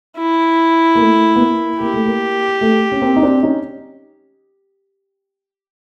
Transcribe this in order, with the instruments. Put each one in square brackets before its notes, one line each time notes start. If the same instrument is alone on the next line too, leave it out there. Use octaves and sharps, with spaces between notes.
[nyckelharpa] E4
[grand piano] A#3
A3
B3
A#3
[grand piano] A#3 [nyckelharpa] G4
[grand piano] A3
A#3
A3
C#4
A#3 C4
D#4
C4 D4
C#4 D#4